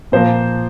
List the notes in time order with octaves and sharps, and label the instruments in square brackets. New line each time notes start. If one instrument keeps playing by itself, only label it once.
[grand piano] A#2 F3 A#3 C5